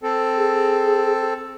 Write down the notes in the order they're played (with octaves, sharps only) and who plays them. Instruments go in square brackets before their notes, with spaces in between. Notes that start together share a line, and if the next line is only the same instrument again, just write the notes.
[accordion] C4 A4
[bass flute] G#4